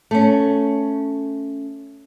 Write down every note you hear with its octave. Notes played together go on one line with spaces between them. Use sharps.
A3 C#4